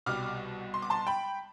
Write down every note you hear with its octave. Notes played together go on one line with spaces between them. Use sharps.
C2 B2 G3 D6 F6
C6
D6
A5 C6
G5 B5